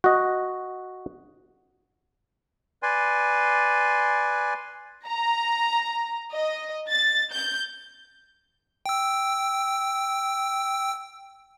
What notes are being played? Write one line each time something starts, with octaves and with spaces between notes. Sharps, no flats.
F#4 D#5
B4 D5 G#5 C6
A#5
D#5
A6
G6
G5 E6